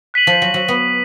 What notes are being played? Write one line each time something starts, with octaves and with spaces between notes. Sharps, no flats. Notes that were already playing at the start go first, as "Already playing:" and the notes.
F#6 B6 D#7 F#7
F3
F#3
F#3
B3